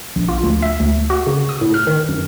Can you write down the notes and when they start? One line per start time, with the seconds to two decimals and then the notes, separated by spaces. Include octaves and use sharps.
0.16 A#1
0.28 F4
0.43 D2
0.62 E5
0.80 D2
1.10 F#4
1.27 C#3
1.49 D#6
1.61 A2
1.74 F6
1.87 D#3
2.09 F#2